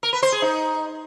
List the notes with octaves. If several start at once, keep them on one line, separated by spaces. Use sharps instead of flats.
A#4
B4
C5
G#4
D#4